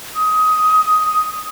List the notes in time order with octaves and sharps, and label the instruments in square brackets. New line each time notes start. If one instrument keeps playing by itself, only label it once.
[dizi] D#6